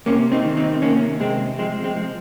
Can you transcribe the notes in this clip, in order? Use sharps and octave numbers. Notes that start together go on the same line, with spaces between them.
C3 A#3 C#4
C4 D#4
D#3
C4 D#4
C3 A#3 C#4
C3 G#3 C4
F3 G#3 C4
G#3 C4
F3